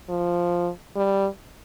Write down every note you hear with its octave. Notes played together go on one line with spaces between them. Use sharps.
F3
G3